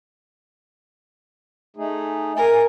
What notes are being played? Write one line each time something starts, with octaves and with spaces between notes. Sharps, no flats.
A3 D#4 G#4
A#4 G#5